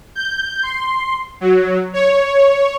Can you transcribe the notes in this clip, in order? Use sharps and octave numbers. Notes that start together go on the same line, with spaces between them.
G6
C6
F#3
C#5